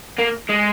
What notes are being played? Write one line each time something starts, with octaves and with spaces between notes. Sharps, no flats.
A#3
G#3